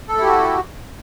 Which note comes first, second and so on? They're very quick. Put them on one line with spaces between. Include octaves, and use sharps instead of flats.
A4 A3 E4 G4 F#4